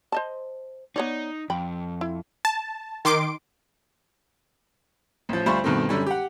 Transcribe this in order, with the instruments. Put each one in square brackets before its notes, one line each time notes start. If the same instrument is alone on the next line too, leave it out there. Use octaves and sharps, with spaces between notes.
[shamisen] C5 D#5 A5
[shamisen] B3 C#5 D5 [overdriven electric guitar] D#4
[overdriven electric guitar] F2 [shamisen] G5 B5
[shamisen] E4
[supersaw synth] A5
D#3 C6 D6 D7
[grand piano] A1 F3
D2 G3 F4 C5 B5 C#6
G2 B2 D#3 A3 C4
F#2 D3 G3 C#4
G4 F#5